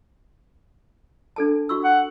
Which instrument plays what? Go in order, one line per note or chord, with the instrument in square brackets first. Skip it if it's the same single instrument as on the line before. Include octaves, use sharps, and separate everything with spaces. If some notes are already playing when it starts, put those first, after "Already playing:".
[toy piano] D4 A4 A5
F#4 C#6 E6
[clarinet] F#5